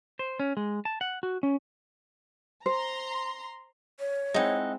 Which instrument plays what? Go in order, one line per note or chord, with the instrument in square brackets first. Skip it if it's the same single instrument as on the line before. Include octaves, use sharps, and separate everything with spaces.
[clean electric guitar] C5
C#4
G#3
A5
F#5
F#4
C#4
[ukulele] C5 [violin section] A#5 C6
[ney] C#5
[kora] G#3 C4 E4 [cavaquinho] D#4 F#5